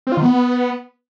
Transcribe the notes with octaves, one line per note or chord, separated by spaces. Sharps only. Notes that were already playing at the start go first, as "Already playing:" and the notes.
C4
F4
D#3
B3